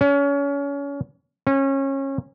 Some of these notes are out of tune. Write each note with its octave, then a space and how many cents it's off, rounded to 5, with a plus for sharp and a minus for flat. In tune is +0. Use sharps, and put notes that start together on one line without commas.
C#4 +30
C#4 -25